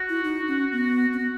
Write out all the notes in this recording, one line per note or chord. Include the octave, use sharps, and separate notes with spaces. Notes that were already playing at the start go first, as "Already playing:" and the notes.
Already playing: F#4
E4
D#4
C#4
B3
C4
B3